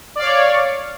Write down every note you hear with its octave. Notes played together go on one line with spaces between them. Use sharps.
C#5 D5 F5